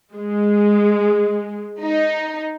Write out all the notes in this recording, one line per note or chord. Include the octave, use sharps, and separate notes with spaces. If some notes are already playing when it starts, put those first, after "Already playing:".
G#3
D#4